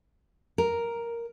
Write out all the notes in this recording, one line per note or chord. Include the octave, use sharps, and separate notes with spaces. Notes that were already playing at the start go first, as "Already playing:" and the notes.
A#4